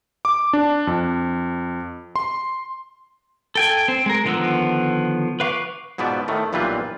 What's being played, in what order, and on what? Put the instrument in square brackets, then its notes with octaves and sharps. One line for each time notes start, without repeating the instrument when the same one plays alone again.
[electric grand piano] D6
D4
F2
C6
[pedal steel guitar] A4 G5 G#5
C4
G#3 A#4
D3 D#3 F3 B3 E6
B4 F5 C#6 D6
[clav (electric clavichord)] G#2 B2 F3 B3 D5 E5
A2 D#3 A3
B1 A#2 E3 G3 F4 B4